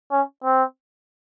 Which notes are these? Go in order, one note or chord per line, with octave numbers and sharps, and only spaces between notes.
C#4
C4